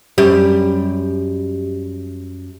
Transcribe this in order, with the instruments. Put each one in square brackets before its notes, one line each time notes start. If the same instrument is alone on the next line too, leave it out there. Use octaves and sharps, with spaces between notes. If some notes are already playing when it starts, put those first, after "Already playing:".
[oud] F#2 G3 G4